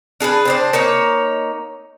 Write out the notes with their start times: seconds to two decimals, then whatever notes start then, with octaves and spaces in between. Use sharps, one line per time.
0.20 D4 G#4 A#4 B4
0.45 C4 D4 C5
0.73 A#3 D#4 C#5